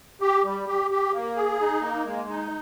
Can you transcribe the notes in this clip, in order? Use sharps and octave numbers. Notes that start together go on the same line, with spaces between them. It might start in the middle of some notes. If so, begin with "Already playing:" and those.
G4
G3
G4
G4
A#3
G#4
D#4
A#3
G#3
D#4